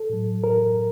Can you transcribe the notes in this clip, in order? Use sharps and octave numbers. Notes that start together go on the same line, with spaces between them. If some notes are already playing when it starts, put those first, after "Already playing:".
Already playing: A4
A2 F#3
A#4